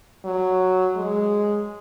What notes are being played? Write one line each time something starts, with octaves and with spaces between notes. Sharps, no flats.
F#3
G#3